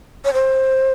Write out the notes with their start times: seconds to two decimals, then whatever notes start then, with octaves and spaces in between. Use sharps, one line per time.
0.25 C#5
0.33 C5